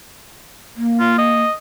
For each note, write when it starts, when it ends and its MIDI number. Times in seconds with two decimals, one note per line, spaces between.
0.76 1.42 58
1.00 1.16 65
1.18 1.53 75